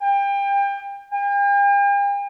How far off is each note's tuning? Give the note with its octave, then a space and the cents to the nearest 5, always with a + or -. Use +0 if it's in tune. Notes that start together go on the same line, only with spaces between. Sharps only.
G5 +30
G5 +45